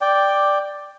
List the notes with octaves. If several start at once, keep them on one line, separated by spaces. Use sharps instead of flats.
D5 G5